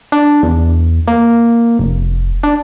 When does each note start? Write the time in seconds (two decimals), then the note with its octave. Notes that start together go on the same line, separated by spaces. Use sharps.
0.12 D4
0.43 E2
1.08 A#3
1.79 F1
2.43 D4